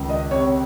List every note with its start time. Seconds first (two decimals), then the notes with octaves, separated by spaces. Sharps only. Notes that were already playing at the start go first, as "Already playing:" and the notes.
Already playing: C#2 D#3
0.09 D#5
0.31 C3 C#5